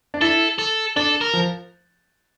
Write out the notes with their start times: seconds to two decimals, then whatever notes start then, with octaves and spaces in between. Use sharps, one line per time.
0.14 D4
0.21 E4 A4
0.58 A4
0.96 D4 A4
1.21 A#4
1.33 F3